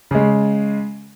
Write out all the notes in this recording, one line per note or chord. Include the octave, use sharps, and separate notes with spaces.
C#3 G#3